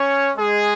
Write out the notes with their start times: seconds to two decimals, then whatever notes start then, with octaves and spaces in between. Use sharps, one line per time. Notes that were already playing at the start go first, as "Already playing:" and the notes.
Already playing: C#4 C#5
0.37 G#3 G#4